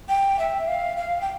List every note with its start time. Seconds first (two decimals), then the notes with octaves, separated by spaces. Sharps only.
0.09 G5
0.39 E5
0.68 F5
0.97 F5
1.21 G5